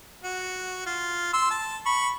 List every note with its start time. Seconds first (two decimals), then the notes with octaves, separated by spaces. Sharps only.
0.24 F#4
0.87 F4
1.34 C6 E6
1.51 A5
1.86 B5 C#6